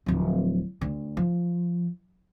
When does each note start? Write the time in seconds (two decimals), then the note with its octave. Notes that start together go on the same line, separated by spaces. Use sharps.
0.06 D1 F3
0.81 D2
1.17 F3